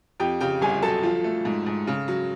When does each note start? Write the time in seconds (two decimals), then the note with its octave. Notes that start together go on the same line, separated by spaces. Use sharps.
0.20 F2 G4 G5
0.41 C#3 G4 G5
0.62 G1 G#4 G#5
0.82 F#3 A4 A5
1.03 F3
1.24 A3
1.45 G#2
1.66 G#2
1.87 C#3
2.08 F#3